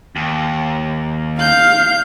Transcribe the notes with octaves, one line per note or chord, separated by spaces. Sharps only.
D#2
F5 G6